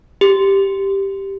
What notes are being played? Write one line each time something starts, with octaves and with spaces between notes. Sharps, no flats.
G4